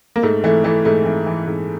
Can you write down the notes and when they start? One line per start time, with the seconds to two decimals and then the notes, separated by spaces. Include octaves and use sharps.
0.16 A#3
0.23 G#2 A3
0.44 E3 A3
0.64 E3 A3
0.85 G#2 A3
1.06 E3
1.26 E3
1.47 G#2